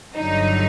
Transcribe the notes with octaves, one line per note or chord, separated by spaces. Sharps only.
G1 G2 D3 F#3 D#4